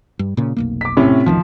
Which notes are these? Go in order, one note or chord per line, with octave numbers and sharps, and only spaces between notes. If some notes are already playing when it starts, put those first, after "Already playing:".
G2
A#2 C#3
F1 B1 A#3
D6 B6
A2 C3 C#4
F#1 D2 D#3 F3